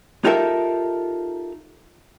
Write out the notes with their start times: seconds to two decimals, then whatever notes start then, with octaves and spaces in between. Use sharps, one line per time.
0.24 D#4 F4 G4 A4 A#4 E5